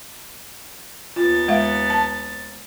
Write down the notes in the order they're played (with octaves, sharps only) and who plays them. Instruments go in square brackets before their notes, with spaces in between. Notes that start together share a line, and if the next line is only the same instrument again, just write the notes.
[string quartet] D#2 B3 A6 [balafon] F4
[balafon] G#3 E5 F5
A5